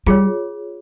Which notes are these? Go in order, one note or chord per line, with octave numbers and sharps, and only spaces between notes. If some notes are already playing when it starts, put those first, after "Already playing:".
G3 F4 G#4 C#5